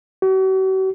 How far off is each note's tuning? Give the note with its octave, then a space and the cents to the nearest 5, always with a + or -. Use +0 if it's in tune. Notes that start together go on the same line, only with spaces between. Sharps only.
F#4 +45